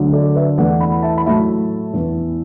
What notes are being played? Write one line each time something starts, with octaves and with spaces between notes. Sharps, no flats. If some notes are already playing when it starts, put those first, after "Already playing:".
Already playing: D2 D3 F#3
A4 D5
B4 E5
E2 E3 A3 D5 F#5
F#5 B5
E5 A5
B5
A2 F#3 A3 E5 A5
E2 E3 B3